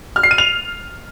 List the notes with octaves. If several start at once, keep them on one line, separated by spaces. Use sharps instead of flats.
F6
C7
D#7
F7